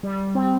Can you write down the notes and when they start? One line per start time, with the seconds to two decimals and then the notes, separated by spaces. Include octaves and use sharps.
0.03 G3
0.35 C4